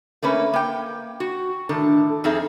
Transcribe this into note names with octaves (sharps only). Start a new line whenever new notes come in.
A3 A#3 C#4 B4
A#3 G5
F#4
A2 D#3 D4 A4
F2 C4 D#4 G#4 A4 E5